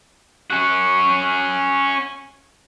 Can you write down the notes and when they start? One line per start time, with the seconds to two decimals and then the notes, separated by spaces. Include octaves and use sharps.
0.50 C#4 F#4